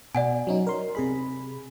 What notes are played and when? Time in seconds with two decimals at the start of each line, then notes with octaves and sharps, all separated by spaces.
0.15 B2 D5 F#5 G#5
0.47 F#3 C#4 D#4
0.67 A#4 C6
0.95 C3 G#4 B5